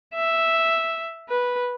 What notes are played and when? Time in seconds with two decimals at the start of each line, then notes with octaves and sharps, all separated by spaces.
0.14 E5
1.28 B4